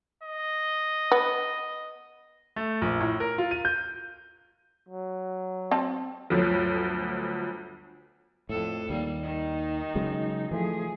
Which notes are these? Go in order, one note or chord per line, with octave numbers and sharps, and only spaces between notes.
D#5
B3
A3
A#1
A2
A#4
F4
D#7
G6
F#3
C4 A5
G1 D2 F3 F#3
F2 A2 A4
D#2 G3 A#3
D#3 D#4
C#3 F#3 G#3
E3 F3 A3 G#4